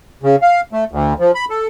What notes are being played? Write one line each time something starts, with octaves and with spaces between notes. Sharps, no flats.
C#3
F5
A3
D2
F3
B5
A4